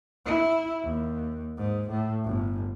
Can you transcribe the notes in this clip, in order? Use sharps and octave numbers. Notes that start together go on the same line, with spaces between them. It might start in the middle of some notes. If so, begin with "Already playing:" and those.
E4
D#2
G#2
A2
G1